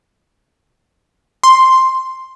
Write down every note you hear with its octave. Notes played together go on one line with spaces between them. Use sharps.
C6